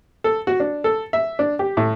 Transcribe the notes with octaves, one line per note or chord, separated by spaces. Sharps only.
A4
F#4
D4
A4
E5
D4
G4
A2